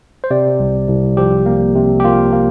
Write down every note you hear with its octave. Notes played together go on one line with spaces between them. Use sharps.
C5
C3 D5
C2
C2
F3 G4
A#3
C3
G4
A#3 F4
A#3